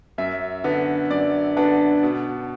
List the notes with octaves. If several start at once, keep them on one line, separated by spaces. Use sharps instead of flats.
F#2 E5
D3 B3 D4
F#2 D5
D3 B3 D4
B2